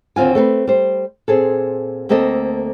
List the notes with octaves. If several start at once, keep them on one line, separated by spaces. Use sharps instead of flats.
D#2 D3 C4 F4 G#5
A3 C4 A4 B4
G3 C5
A#2 C4 G#4 A4
D2 A3 A#3 C4 A4 D#5